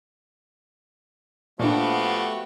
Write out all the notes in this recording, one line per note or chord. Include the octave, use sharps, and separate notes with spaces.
A#2 F3 A3 B3 D4 F#4 G4 C#6